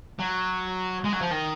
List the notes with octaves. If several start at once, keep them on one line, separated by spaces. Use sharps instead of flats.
F#3
G#3
F#3
F3
D#3